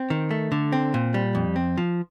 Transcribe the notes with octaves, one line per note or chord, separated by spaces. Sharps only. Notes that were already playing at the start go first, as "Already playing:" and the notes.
Already playing: C4
D#3
A3
D3
C4
A#2
G3
F2
C4
F3